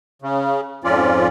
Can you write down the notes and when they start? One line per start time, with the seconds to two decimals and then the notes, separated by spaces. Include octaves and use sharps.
0.22 C#3
0.84 F2 G#2 F3 C#4 F4 D5